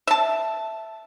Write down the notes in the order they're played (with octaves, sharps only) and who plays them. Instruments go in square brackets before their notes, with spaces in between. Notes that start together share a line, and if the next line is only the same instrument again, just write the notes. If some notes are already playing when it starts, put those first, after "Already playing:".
[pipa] E5 A5